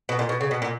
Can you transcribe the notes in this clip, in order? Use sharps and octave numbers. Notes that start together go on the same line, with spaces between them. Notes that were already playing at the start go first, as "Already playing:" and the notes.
B2
A#2
B2
C#3
B2
A#2